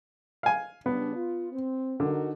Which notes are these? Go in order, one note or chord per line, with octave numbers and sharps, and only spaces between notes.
F5 G#5
C#3 G3 B3 D4
F4
C4
D3 D#4 F#4 A#4